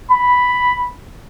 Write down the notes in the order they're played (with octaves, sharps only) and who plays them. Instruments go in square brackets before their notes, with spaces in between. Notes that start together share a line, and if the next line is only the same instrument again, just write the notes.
[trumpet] B5